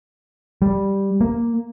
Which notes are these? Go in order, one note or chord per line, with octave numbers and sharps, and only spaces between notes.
G3
A#3